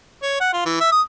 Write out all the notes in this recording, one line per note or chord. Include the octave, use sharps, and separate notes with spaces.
C#5
F#5
F4
E3
E5
D#6